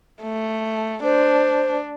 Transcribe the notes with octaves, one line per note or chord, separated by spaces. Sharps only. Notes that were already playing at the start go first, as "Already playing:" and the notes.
A3
D4 C5